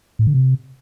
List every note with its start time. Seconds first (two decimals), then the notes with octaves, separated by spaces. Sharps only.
0.19 A2
0.27 D3
0.34 C3